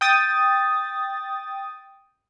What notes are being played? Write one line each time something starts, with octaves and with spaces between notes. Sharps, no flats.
G5 D#6 A6